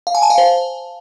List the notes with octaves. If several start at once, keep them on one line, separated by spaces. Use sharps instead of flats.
F5
G#5
A5
F5
C5